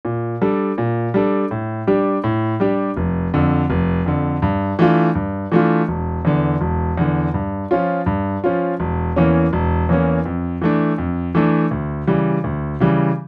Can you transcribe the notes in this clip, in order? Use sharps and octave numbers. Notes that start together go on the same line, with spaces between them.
A#2
G3 D4 A4
A#2
G3 D4 A4
A2
G3 D4 G4
A2
G3 D4 G4
F1
F2 D3
F1
F2 D3
G2
E3 A3 D4 F4
G2
E3 A3 D4 F4
E1
E2 D3
E1
E2 D3
G2
F3 C#4 F4
G2
F3 C#4 F4
E1
E2 E3 A#3 C#4
E1
E2 E3 A#3 C#4
F2
E3 A3 D4
F2
E3 A3 D4
D2
C#3 E3 G3
D2
C#3 E3 G3